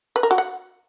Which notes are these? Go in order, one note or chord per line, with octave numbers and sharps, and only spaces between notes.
B4
A#4
F#4
F#5